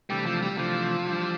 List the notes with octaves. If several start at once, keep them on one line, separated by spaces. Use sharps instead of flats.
C3 E3 G3 A3 D4
F3
G3
C3 E3 F3 A3 D4
E3 G3 D4